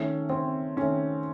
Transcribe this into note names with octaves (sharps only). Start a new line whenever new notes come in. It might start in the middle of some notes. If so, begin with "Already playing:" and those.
Already playing: D#3 A3 C#4
C4
D#3 A3 C#4